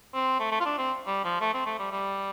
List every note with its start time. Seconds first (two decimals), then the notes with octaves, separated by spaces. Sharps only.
0.14 C4
0.40 A3
0.52 A3
0.60 F4
0.65 D4
0.78 C4
1.07 G3
1.24 F3
1.41 A3
1.54 C4
1.66 A3
1.79 G3
1.91 G3